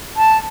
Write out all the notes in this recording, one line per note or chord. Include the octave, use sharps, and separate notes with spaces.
A5